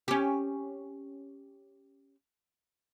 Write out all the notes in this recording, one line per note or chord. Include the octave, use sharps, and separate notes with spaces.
C#4 G4